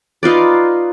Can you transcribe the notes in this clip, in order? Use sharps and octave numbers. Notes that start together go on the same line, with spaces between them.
D#4 F4 B4 D5